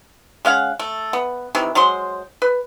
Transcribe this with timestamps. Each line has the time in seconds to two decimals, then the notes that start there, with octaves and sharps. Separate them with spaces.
0.45 G#3 C#4 F5 F#5
0.79 A3
1.13 B3
1.55 C3 D#3 E3
1.75 F#3 G#3 C5 C6
2.42 B4